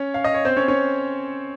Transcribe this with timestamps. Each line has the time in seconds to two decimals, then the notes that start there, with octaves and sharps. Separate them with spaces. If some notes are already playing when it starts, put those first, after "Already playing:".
Already playing: C#4 C#5
0.14 F5
0.24 D#5
0.34 C#5
0.45 C4 C5
0.56 C#4 C#5
0.68 C#4 C#5